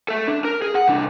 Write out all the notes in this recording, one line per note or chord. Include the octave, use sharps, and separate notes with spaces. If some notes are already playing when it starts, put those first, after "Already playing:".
A4 E5
D4
A#4
G#4
F#5
C2 D4